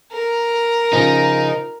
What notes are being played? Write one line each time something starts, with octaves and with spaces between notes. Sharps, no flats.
A#4
C#3 F3 D#4